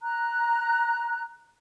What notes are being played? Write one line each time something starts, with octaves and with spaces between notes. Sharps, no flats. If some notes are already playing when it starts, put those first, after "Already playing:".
A#5 F#6